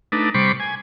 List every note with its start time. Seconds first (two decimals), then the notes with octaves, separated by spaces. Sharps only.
0.12 A3 D4 D#4 B4
0.34 C3 G3 C5 B5 C#6 D6
0.60 G#5